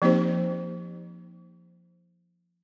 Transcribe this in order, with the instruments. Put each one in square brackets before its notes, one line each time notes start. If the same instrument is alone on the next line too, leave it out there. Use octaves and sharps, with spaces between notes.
[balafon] F3 A#3 C4 D#4 G4 C5